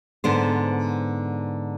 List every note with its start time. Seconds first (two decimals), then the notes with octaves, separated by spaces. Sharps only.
0.24 G#2 D3 B3 C5